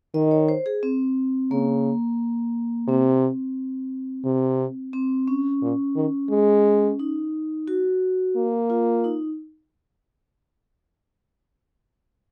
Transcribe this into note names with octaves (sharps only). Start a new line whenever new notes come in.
D#3 D#5
C#5
C5
G#4
C4
C#3 A#3
C3 C4
C3
C4
C#4
A#2
D#3
G#3
D#4
F#4
A#3
F4
D#4